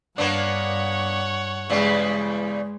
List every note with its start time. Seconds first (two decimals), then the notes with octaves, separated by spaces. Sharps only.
0.18 G2 A#3 B3 D4 C#5 F#5
1.70 E2 C#3 G3 G#3